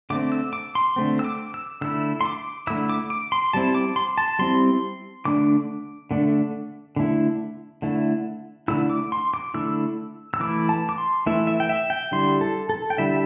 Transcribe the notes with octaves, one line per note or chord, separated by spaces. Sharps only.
D3 A3 C4 D6
E6
D6
C6
D3 A3 C4
E6
D6
E6
D3 A3 E4 E6
C6
D6
D3 A3 E4 E6
D6
D6
C6
G3 C4 E4 A5
D6
C6
A5
G3 C4 E4 C6
D3 A3 D4 D6
D3 A3 D4
D3 A3 E4
D3 A3 E4
D3 A3 E4 E6
D6
C6
D6
D3 A3 E4 E6
E6
E3 A3 E4 D6
A5
D6
C6
E3 A3 E4 E5
E5
G5
E5
G5
D3 G3 E4 C6
A4
A4
G5
D3 G3 E4 E5